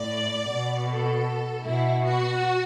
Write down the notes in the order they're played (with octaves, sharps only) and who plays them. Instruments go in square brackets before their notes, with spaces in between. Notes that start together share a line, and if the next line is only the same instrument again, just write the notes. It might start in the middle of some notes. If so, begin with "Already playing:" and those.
Already playing: [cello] A2 [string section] D5
[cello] B2
[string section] A4
[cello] B2 [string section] E4
[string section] F#4